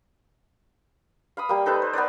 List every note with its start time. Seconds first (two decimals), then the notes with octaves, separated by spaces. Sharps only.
1.37 F5 B5 D#6
1.49 G3 A#3
1.66 D#4 A4 B4 C5
1.82 C5
1.93 B3 A#4 B4 D5